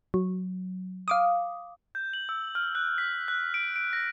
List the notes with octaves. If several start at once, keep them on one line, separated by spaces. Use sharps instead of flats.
F#3
F5 D6 D#6
G6
F#7
E6
F6
F#6
B6
F#6
D7
D7
A#6